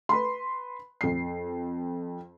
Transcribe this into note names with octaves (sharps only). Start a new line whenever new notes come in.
B4 B5 C6
F2 C7